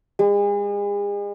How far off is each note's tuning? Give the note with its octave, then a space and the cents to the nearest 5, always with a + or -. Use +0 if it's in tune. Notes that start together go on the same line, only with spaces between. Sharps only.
G#3 -40